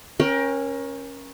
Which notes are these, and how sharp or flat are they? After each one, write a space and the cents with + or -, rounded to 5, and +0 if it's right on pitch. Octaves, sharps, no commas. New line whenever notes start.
C#4 -15 A#4 +25 G5 +0